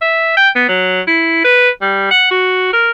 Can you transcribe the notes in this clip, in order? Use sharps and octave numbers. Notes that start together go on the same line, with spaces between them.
E5
G5
B3
F#3
E4
B4
G3
F#5
F#4
A#4